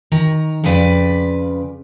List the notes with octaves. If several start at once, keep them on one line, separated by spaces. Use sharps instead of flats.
D#3 A#5
F2 C#3 B4 D5